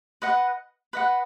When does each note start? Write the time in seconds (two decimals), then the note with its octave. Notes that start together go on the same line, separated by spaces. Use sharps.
0.22 B4 D#5 F#5
0.93 B4 D#5 F#5